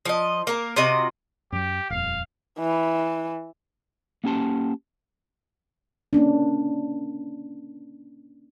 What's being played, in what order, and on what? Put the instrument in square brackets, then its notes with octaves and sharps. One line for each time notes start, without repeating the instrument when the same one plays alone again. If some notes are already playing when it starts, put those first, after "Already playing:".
[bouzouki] F3 D#5
A#3 A#4
C3 F4 F#4 D#5
[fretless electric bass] F#2 F#3 [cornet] G4
[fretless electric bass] D#1 F2 [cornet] F5
[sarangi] E3
[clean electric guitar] A#3 C#4 G4 A5 C6
[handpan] A#3 C#4 D4